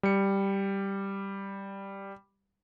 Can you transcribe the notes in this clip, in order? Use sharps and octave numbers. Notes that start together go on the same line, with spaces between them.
G3 C#7